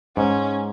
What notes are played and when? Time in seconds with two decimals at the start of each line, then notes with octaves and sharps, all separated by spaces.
0.17 G#2 C#4